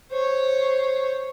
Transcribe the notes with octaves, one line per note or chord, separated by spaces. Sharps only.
C5 C#5